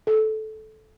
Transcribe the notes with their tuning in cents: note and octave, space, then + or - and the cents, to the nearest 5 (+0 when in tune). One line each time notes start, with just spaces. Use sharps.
A4 -15